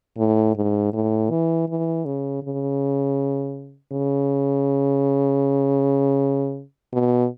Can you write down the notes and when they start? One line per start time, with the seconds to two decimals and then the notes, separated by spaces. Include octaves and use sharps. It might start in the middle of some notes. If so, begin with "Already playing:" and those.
0.17 A2
0.55 G#2
0.93 A2
1.30 E3
1.68 E3
2.05 C#3
2.42 C#3
3.92 C#3
6.93 B2